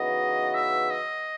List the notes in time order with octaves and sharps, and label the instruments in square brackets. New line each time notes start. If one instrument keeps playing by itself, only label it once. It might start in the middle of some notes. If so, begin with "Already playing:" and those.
Already playing: [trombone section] C#3 E3 B3 D#4 F#4 [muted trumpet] D#5
[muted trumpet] E5
D#5